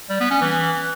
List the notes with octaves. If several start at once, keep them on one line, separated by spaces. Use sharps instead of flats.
G3
B3
C#4
E3